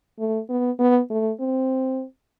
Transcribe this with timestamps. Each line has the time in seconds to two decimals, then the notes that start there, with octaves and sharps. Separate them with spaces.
0.19 A3
0.49 B3
0.79 B3
1.10 A3
1.40 C4